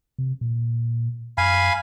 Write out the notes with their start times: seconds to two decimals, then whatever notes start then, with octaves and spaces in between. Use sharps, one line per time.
0.19 C3
0.41 A#2
1.38 F#2 F5 G#5 B5